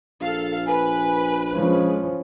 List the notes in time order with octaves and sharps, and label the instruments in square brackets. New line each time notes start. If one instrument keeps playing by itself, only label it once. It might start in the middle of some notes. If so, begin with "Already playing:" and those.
[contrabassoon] A#1 [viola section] A4 F5
[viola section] B4 [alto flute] G#5
[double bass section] F3 C#4 [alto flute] G#3